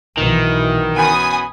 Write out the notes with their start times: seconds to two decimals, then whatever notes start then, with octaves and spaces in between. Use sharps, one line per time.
0.17 B1 B2 D#3 E3
0.96 F#2 B3 G#5 B5 D#6